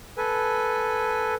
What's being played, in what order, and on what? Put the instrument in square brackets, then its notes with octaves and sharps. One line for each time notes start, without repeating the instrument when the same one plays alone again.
[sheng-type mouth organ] A4 B4 G#5